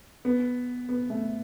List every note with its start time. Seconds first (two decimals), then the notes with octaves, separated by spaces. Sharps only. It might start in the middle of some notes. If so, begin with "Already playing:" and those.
0.25 B3
0.89 B3
1.10 A3